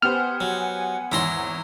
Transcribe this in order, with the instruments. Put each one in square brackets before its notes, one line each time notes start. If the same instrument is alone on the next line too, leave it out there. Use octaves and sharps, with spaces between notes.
[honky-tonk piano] B3 G4 C5 [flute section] F#5 G#5 [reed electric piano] F6
[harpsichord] F#3
[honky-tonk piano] G#1 E2 C#5 [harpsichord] E4 A#5 C6